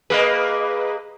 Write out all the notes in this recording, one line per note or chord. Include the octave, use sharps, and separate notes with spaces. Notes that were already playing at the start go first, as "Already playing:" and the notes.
A#3 G#4 B4 D#5